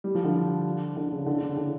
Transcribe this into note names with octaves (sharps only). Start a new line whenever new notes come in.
G3
F3
D3
D3
C#3
D3
C#3
D3